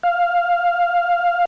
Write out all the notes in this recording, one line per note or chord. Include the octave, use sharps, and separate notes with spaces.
F5